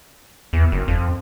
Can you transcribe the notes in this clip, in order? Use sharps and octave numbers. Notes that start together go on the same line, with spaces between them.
E2
F#1
F2